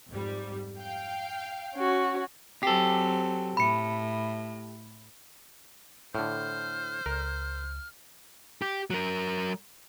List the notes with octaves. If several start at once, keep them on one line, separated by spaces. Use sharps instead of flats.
F2 G#2 G3
F5 G5
C#4 F#4
F#3 C4 G4 A4 C7
A2 B5 C#7
A2 D3 C5 F6
C#2 A#4
G4
F#3 A#4